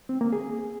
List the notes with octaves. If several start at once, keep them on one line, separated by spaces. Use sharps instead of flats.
C4
A#3
G#4